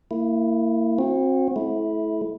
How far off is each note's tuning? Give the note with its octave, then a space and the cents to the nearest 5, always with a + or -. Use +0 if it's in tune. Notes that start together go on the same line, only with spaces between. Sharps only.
A#3 -30 E4 +0
C4 +25 F#4 -30
A3 -30 E4 -10